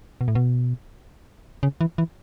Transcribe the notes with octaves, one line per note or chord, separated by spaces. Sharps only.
B2
A2
B2
C#3
E3
E3